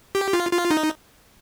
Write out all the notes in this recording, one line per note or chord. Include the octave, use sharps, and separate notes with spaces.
G4
F4
F4
D#4